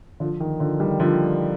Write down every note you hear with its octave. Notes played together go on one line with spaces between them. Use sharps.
D3 F3
D#3
D3 F3
D#3 G3
D3 F3